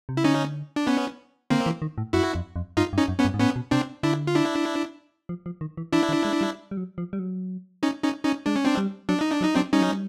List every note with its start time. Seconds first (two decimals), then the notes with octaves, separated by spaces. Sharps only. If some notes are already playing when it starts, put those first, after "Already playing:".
0.09 C3
0.17 C#3 E4
0.24 D3 C#4 D#4
0.76 D4
0.87 B3 C#4
1.50 D3 A#3 C4
1.66 E3
1.82 D#3
1.98 A2
2.13 F#2 E4 F#4
2.35 F2
2.56 F2
2.77 G2 D#4 F4
2.93 G2
2.97 C#4 D#4
3.08 F#2
3.19 B3 C#4
3.25 G2
3.34 G#2
3.40 A2 B3 C#4
3.56 B2
3.71 C3 C4 D4
4.03 D3 D4 E4
4.27 F4
4.35 D4 E4
5.29 F3
5.46 F3
5.61 D#3
5.77 E3
5.93 E3 D4 E4
6.09 D#3
6.25 G#3
6.41 G3
6.71 G3
6.77 F#3
6.98 F3
7.13 G3
7.19 F#3
7.83 C#4 D#4
8.03 C#4 D#4
8.25 C#4 D#4
8.46 G#3 D4
8.56 C#4
8.65 C4 D4
8.77 G3
9.09 F#3 D4
9.21 D#4
9.32 D4
9.41 F#3
9.45 D#4
9.55 F#3 C4 D4
9.72 G3 C#4 D#4
9.81 F#3
9.89 G3